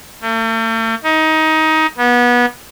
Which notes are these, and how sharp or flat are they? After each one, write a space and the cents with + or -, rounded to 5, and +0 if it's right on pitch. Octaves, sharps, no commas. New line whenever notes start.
A3 +45
D#4 +20
B3 -25